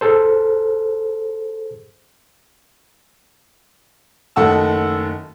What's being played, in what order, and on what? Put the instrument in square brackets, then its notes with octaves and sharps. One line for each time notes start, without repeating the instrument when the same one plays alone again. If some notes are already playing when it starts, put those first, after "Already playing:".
[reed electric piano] G#4 A4 C5
[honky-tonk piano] F#1 D#3 A3 F#5 A5 E6